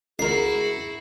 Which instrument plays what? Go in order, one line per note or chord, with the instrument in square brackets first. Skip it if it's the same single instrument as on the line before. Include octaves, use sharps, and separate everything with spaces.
[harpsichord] C#2 A#4 [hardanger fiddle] E4 F#4 [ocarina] G#4 [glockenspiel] C7